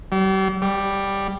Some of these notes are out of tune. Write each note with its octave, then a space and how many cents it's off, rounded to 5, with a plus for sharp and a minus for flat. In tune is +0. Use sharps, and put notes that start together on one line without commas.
G3 -40
G3 +5